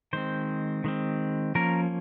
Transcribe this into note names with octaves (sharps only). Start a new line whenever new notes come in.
D#3 G#3 C4 C5
D#3 G#3 C4
F3 A#3 C#4 A#4